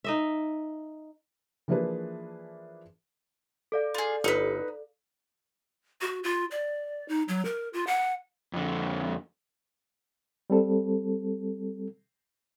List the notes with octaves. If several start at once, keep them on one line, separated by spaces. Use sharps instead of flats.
D#4 D#5 E5
E3 F3 A#3 D4 G#4 B4
A4 D5 F5
F4 G#4
G1 D#4 B4
F#4
F4
D5
D#4
F#3
A#4
F4
F#5
F2 D3
G3 C4 A4